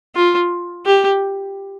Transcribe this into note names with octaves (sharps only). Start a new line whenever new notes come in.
F4
G4